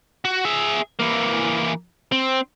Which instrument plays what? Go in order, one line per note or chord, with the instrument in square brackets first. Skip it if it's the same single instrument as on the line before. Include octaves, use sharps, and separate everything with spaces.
[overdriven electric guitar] F#4
G#4 E5
E3 A#3
C4